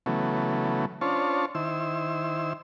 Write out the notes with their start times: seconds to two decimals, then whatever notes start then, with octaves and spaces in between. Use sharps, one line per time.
0.06 C#3 E3 F#3 A3 B3
1.01 C#4 D4 F4 C5 C#5 A5
1.55 D#3 E4 C5 E6